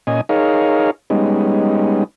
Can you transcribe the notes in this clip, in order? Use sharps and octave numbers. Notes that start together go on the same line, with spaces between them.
A#2 C#4 D#5 G#5
D#4 G#4 A#4 C#5 F5
G3 G#3 B3 C#4 D#4